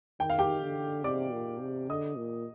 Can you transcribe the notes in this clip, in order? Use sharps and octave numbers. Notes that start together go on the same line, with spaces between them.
D#3 G5
F5
G4 G5
D3
C3 D5 D6
A#2
C3
D3 D#5 D#6
A#2